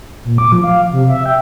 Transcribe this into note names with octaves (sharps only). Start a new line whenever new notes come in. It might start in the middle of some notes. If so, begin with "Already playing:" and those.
A#2
D6
F3
F5
C3
E5
G5